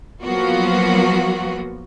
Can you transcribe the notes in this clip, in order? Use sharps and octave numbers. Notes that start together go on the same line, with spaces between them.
F3 F#3 A#3 B3 F4 F#4